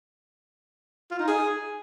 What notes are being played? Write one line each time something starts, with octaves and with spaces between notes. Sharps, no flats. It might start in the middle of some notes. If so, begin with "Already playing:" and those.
F4
D#4
G#4